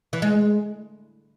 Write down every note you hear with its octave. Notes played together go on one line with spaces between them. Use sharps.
E3
G#3